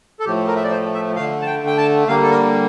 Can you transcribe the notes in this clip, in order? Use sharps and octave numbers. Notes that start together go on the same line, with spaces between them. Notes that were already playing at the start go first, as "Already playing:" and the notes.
A4
A2 F3 A3 G4
A#4
E5
D5
C5
E5
D3 A3 F5
A5
G5
G5
A5
D3 G3 A#3 F5
A4
A#4